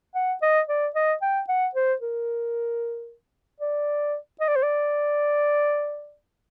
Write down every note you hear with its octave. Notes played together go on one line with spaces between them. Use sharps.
F#5
D#5
D5
D#5
G5
F#5
C5
A#4
D5
D#5
D5
C5
D5